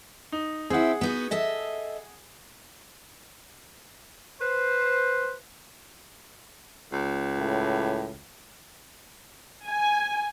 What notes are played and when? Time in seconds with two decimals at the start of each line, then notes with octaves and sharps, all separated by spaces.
0.32 D#4
0.70 C4 E4 G#4 F#5
1.01 B3 D#4 F#4
1.31 A4 D#5 E5
4.40 B4 C5
6.92 C#2
7.38 A2
9.66 G#5